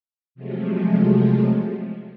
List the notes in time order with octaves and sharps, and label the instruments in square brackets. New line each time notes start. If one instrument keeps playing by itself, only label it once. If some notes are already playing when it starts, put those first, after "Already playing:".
[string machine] C3 F3 F#3 G#3 A3